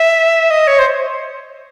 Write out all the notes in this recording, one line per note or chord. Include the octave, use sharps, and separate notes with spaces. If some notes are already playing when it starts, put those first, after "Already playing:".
Already playing: E5
D#5
C#5
C5